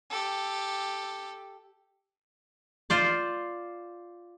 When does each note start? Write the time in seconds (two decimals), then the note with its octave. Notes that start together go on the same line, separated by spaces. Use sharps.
0.10 G4 A4
2.90 F4 C5 D5